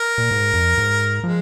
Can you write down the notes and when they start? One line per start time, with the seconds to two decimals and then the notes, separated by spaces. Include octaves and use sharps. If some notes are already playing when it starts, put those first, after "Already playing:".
Already playing: A#4
0.18 A#2
0.31 G#2
0.53 F2
0.78 G#2
1.24 F3 G#3